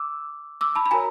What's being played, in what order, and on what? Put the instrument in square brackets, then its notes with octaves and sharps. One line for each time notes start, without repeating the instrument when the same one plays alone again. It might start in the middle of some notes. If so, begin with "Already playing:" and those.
Already playing: [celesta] D6 E6
D6 E6
A5 B5
B5
F#4 A#4 C#5 G#5 A#5